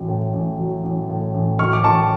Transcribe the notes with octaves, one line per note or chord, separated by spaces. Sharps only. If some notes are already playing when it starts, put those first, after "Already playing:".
Already playing: A1 F#3
A2
A1
F#3
A1
A2
A1
F#3 C#6 F6
D6
A1 A5 C#6